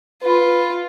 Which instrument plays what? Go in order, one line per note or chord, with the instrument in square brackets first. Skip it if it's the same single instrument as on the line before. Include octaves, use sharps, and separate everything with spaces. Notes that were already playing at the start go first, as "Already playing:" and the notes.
[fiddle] F4 [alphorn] B4